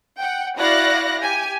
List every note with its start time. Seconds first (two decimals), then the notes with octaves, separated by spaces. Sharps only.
0.17 F#5 G5
0.57 E4 F#4 D5 F5 F#6 A#6
1.19 G4 G#5